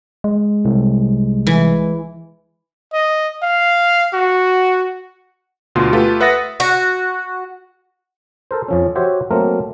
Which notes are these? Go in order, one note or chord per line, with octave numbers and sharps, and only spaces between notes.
G#3
C2
E3
D#5
F5
F#4
D2 B2 D3 F4 C6
A3 F4 G4 A4 B4
B4 E5 F#5 D#6 A6 A#6
F#4
A4 A#4 C5
F2 F3 C#4
F#4 G4 C5 C#5 E5
F#3 A3 A#3 C4 A#4